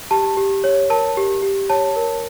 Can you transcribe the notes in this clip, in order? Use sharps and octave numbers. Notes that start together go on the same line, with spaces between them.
G4 A5
G4
C#5
A#4 A5
G4
G4
C#5 A5
A#4